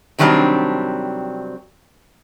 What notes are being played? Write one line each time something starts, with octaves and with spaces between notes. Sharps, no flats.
C3 D#3 F#3 G3 C4 D4